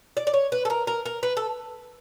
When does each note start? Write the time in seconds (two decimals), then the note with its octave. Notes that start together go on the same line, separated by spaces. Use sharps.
0.17 D5
0.27 D5
0.34 C#5
0.52 B4
0.65 A4
0.70 A#4
0.87 A#4
1.06 A#4
1.23 B4
1.37 A4